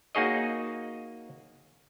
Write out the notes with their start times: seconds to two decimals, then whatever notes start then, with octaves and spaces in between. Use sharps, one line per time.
0.15 A#3 D#4 F#4 G#4 C#5 D#5